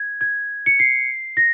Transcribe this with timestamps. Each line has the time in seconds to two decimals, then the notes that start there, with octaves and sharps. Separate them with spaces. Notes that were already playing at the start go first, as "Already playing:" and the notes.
Already playing: G#6
0.21 G#6
0.66 C#7
0.79 C7
1.37 A#6